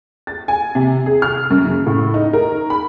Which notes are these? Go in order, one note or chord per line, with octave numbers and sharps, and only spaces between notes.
A6
G#5
C3
G#4
F6
F#2
C#3
A2
D#4
A#4
B5